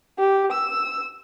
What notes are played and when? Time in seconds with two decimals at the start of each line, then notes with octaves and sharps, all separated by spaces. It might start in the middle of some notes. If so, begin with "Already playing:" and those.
0.19 G4
0.52 E6